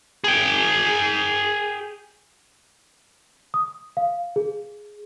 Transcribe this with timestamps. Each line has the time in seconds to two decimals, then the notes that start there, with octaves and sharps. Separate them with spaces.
0.24 G#4 G5
3.54 D#6
3.97 F5
4.36 G#4